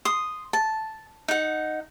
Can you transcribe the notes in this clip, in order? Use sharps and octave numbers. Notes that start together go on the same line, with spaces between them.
C6 D#6
A5
D#4 F#5